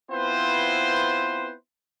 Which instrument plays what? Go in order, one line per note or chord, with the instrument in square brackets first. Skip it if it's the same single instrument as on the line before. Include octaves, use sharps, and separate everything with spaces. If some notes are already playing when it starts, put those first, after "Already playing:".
[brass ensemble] B3 C4 E4 F4 B4 C5